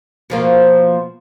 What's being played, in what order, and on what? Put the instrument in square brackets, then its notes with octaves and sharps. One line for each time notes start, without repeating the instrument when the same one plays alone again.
[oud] B2 F3 A#3